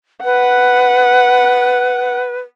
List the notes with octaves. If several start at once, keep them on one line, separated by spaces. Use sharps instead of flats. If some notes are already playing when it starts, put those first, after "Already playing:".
B4 F#5